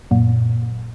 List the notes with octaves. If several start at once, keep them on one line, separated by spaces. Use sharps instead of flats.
F#2 A#2